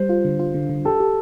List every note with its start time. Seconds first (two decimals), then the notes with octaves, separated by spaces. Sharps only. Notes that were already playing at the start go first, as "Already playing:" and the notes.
Already playing: G3 C5
0.09 F4
0.25 D3
0.39 F4
0.54 D3
0.69 D3
0.85 G4 A4
1.00 G4